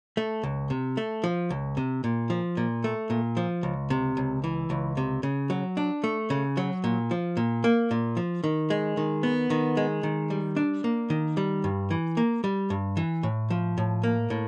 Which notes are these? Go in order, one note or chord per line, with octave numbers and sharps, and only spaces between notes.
A3
C#2
C3
A3
F3
C#2
C3
A#2
F3
A#2
A3
A#2
F3
C#2
C3
C#2
E3
C#2
C3
C#3
F#3
D4
A3
C#3
F#3
A#2
F3
A#2
A#3
A#2
F3
D#3
G#3
D#3
B3
D#3
G#3
D#3
G3
D4
A#3
D#3
G3
G2
E3
A#3
G3
G2
E3
A2
F3
A2
A#3
A2